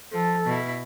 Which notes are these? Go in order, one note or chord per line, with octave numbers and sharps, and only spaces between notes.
F3 A4
B2 E4